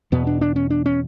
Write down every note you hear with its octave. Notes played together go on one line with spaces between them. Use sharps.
E2 B2 B3
D4
D4
C#4
D4
C#4